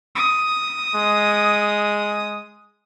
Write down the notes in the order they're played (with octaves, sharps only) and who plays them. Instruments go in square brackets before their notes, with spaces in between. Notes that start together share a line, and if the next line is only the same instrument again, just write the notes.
[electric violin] D#6
[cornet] G#3